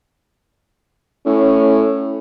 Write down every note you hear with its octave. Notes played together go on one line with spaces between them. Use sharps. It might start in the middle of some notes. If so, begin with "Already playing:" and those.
A2 C#4